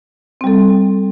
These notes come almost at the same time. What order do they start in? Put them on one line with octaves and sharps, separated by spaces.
C4 G3 A4